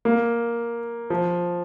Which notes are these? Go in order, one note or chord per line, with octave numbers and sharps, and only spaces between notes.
A#3
F3